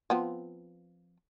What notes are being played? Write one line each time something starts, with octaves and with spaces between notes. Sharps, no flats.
F3 B3 C4